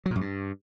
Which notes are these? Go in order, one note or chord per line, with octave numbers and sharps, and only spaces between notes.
F#3
A#2
F#2
G2